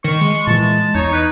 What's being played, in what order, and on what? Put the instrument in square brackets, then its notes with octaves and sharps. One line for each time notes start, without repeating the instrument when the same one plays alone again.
[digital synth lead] D#3 [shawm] C#6
[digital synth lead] G#3
[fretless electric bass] A#2 E3 [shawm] A5
[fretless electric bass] E2 [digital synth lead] D#4 [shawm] C#5
[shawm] B4